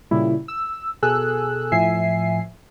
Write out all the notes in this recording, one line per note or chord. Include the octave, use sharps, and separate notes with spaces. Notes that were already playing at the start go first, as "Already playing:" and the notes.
A#2 C#3 G3 E4
E6
B2 G#4 A4 G#5 E6 F#6
A2 F3 E5 G#5 C7